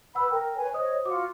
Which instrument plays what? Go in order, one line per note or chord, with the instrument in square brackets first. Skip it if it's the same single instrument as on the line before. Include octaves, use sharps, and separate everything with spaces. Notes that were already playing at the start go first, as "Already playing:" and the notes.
[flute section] B4 B5 [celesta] F#5 E6
[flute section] A#4 [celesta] G5
[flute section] B4 C#5 G#5
[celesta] C5 D#6 [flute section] C#5 D#5
[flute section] F4 F#4 F#5 [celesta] D6